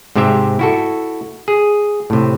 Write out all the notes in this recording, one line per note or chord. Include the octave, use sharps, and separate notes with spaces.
G#2 C3 C4 G4 E5
E4 F#4 A4
G#4
A2 C3